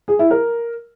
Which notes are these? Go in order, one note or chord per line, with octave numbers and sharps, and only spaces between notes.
G#4
E4
A#4